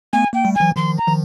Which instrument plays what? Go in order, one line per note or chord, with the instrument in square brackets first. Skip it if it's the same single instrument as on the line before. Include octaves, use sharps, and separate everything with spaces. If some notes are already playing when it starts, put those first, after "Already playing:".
[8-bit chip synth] A3 B3 [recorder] G#5
[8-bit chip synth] A#3 [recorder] G5
[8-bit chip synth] G3 A3
[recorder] G#5
[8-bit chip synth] E3 F#3
[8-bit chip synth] D#3 F3 [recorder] C6
[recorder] A#5
[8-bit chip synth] D#3 F3